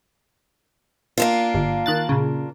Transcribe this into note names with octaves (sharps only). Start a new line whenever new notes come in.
A#3 D4 F4
G1
D#3 F#6 A6
A#2 C#3